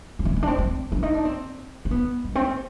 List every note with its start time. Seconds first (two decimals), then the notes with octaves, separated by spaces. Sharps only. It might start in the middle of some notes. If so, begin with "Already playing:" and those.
0.19 B3
0.25 C4
0.36 C4
0.43 D4
0.48 C4
0.59 C4
0.92 D4
1.03 D#4
1.14 D4
1.25 C4
1.85 C4
1.91 B3
2.24 G#3
2.35 C4